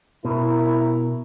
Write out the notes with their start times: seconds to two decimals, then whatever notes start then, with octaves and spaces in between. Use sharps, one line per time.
0.25 B2 E4 A#4